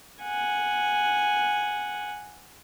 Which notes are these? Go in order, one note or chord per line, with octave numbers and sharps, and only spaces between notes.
F#5 G#5